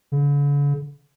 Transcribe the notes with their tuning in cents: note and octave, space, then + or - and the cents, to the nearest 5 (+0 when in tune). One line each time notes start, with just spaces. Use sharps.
D3 -45